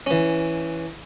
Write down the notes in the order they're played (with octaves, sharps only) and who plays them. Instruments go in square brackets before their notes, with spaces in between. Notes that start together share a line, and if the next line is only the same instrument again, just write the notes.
[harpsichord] E3 C#4